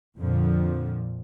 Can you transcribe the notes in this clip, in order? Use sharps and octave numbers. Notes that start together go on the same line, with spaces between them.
F2 A#2 D3 F3